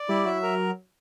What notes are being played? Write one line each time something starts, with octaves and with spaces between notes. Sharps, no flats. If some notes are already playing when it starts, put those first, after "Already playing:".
Already playing: D5
G3 E4
F#3 E5
A#4